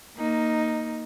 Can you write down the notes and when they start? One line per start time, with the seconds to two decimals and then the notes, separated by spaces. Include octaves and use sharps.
0.17 A#3 D#4